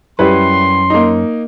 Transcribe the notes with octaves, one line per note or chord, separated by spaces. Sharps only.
F#2 G3 C#4 E4 B4 C6
A#3 D#4